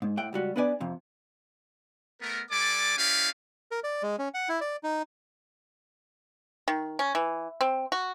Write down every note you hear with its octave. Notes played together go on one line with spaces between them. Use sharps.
G#2
A2 F#5 G5
C#2 G3 F#4
B3 D4 B4 D5 G#5
F2 C3
A3 B3 A#4
G3 A4 D5 G#5 D6
C#4 E4 G4 D5 F5
A#4
D5
G#3
C#4
F#5
E4
D5
D#4
D#3
C#4
E3
C4
F#4